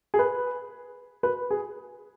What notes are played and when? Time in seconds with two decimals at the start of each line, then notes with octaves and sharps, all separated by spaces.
0.14 G#4
0.19 B4
1.23 B4
1.50 G#4